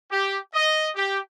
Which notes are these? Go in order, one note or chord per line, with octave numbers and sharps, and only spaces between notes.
G4
D#5
G4